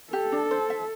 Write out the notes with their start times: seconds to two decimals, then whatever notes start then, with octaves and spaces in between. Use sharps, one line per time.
0.13 G4 A4
0.32 D4
0.51 C5
0.70 E5